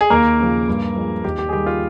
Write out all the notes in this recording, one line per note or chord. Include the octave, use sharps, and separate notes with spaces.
G#4
D#2 A#3 A#4
C#3 F3
G2
F3 G#3
D#2 G4
G4
G#4
D#3 G3 G4
F4